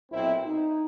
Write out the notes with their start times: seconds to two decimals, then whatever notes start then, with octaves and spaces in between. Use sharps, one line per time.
0.12 B1 A#2 C4 E4
0.45 D#4